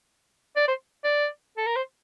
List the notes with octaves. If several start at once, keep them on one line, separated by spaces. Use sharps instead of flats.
D5
C5
D5
A4
A#4
C5